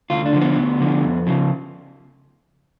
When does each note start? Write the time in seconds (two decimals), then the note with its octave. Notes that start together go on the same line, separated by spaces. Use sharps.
0.10 D2 F4
0.26 D4
0.33 D3 F3
0.41 B3
0.57 D2
0.81 D3 F3
1.03 F2
1.27 C#3 F3